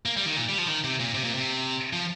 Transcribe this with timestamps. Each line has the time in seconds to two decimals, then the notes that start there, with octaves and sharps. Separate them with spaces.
0.06 A#3
0.17 G3
0.26 D#3
0.37 A#2
0.49 G3
0.58 F3
0.68 D#3
0.84 C3
1.00 A#2
1.14 C3
1.24 A#2
1.35 C3
1.93 F3